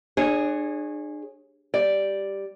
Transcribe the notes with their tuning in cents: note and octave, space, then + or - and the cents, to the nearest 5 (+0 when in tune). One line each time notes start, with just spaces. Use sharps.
D4 +35 G#4 +0 C#5 -20
G3 +0 D5 +0